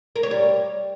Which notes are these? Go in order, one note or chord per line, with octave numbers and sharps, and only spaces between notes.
A#4
C#5
G3